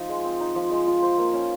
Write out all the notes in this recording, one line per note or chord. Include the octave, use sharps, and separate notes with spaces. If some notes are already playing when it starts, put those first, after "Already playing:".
Already playing: F3 D#4
G#3
C4
D#4
F3
G#3
F4
C5
A#3
C#4